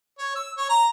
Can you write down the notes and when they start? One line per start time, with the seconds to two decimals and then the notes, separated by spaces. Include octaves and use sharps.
0.18 C#5
0.36 E6
0.57 C#5
0.69 A#5